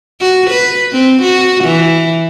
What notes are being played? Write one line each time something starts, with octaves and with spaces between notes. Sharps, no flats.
F#4
B4
C4
F#4
E3